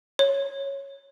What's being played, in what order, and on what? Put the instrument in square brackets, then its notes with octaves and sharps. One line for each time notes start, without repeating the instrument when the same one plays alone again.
[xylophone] C#5